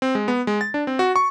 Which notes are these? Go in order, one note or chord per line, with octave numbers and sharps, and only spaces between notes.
C4
G#3
B3
G#3
A6
D4
C4
F#4
C#6